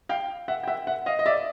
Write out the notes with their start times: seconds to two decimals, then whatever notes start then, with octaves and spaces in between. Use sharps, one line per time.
0.09 F5 G5
0.48 E5 F#5
0.63 G5
0.68 E5 F#5
0.87 E5 F#5
1.06 D#5 F5
1.19 D#5
1.26 D5 E5